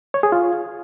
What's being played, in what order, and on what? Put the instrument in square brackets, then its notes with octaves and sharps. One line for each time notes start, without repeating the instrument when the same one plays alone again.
[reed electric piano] C#5
G#4
F4